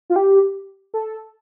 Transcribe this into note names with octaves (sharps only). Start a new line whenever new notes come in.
F4
G4
A4